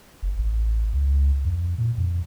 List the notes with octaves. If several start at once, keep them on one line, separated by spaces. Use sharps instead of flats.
F#1
A1
C#2
F2
A#2
F2